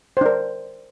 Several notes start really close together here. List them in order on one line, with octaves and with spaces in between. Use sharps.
C5 D4 A#4